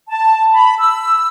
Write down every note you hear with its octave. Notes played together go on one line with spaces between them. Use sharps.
A5
B5
E6